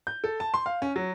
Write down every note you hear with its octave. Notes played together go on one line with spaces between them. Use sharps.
G6
A4
A5
C6
F5
C#4
F#3